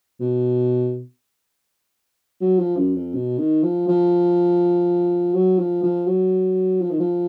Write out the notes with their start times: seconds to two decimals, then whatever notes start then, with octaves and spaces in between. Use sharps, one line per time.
0.20 B2
2.41 F#3
2.59 F3
2.77 F#2
2.96 F2
3.14 B2
3.38 D#3
3.63 F3
3.88 F3
5.34 F#3
5.59 F3
5.83 F3
6.08 F#3
6.81 F3
6.90 D#3
6.99 F3